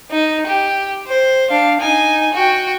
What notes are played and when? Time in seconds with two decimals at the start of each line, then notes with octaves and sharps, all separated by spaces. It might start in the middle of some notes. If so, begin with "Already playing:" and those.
0.11 D#4
0.46 G4
1.06 C5
1.51 D4 F5
1.80 D#4 G#5
2.34 F#4 G5